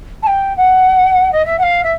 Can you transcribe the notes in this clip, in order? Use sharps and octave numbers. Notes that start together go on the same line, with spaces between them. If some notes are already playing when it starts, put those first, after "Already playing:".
A5
G5
F#5
D#5
E5
F#5
F5
E5